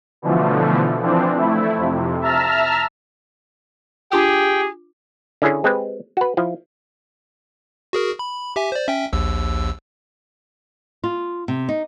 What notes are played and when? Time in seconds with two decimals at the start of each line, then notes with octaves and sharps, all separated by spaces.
0.22 B2 D3 E3 F3 A3
1.02 E3 F3 C4 D4
1.37 A3 E4
1.77 F2 C3
2.21 E5 A5 A#5 E6 F6
4.12 D4 F4 G4 G#4 G5 D6
5.42 D3 C#4 E4 G#4 C#5
5.64 G#3 C4 G4 B4
6.17 F#4 B4
6.37 F3 E4
7.93 F#4 G#4 A#4
8.19 B5
8.56 G4 E5 G#5
8.72 C5 D5
8.88 C#4 E5 G5
9.13 A#1 D#2 E6
11.04 F4
11.48 C3
11.69 D#4